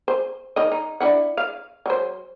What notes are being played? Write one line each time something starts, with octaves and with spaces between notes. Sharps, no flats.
C5
D#3 D#5
D#4
D4 E4 F#5
F5
F#3 C5